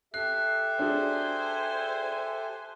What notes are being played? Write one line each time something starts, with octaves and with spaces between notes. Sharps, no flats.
G4 A4 E5 F#6 C7
D4 F#4 G#4 C5 G#5